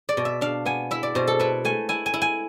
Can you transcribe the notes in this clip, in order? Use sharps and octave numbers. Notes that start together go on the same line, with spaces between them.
D5
B2
E5
D4 F5
B3 G#5
E4 E5
D5
B2 C5
A4
E4 B4
A3 G#5
E4 G#5
G#5
E4
G#5